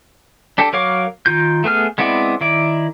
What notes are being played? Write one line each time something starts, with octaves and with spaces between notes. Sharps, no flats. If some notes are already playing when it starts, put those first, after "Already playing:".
D4 G4 A4
F#3 A#4 C#5 F5 D6
D#3 F4 G6
A3 B3 G#4 F6
G#3 B3 C4 E4 D5
D#3 E4 D5